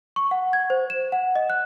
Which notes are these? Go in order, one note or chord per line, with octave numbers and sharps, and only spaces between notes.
C#6
F#5
G#6
C5
E7
F#5
D#5
F#6